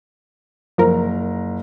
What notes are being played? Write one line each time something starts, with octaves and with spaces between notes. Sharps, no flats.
F#1 F3 A#4 A#5